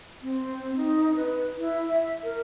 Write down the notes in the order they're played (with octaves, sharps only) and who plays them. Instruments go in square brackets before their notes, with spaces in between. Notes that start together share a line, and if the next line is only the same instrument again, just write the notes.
[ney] C4
D#4
B4
E4
E5
A#4